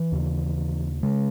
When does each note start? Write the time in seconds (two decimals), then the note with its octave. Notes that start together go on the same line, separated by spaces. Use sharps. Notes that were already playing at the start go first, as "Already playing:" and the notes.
Already playing: E3
0.12 D#2 C#3
1.03 C#3 G#3